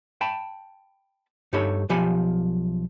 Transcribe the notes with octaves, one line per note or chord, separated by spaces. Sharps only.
G5 A5 B5
G2 D#4 G4 A4 C#5 B5
B1 F3 G4 G#5 B5